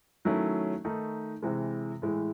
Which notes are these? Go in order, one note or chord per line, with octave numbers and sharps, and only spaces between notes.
D#3 F#3 A3 C#4 E4
D#3 A3 D#4
C3 E3 G#3
A2 E3 G#3